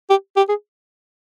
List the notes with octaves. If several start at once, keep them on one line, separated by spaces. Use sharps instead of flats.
G4
G4
G#4